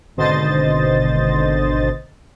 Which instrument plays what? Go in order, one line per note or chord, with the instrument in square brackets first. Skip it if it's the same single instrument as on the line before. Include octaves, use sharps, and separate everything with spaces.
[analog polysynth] G#1 B2 D3 C5 D#5 A6